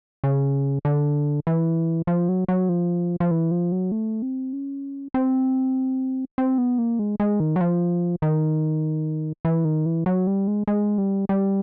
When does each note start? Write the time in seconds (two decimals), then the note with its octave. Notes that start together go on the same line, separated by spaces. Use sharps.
0.24 C#3
0.85 D3
1.47 E3
2.07 F3
2.29 F#3
2.48 F#3
2.69 F3
3.20 F3
3.31 E3
3.51 F3
3.72 F#3
3.92 A3
4.22 C4
4.53 C#4
5.14 C4
6.38 C4
6.58 B3
6.78 A#3
6.99 G#3
7.20 G#3
7.40 D#3
7.56 F#3
7.61 F3
8.22 D#3
9.45 E3
9.65 D#3
9.86 E3
10.06 F#3
10.27 G3
10.47 G#3
10.68 G#3
10.98 G3
11.29 G3